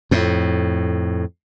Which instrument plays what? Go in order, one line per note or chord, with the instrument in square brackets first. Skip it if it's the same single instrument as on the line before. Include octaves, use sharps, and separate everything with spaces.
[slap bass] F2 A2